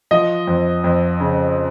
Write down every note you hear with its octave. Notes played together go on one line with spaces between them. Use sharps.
F3 D#5
F2
F2
C#3